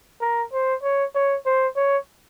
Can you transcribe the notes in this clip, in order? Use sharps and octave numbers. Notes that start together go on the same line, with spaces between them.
A#4
C5
C#5
C#5
C5
C#5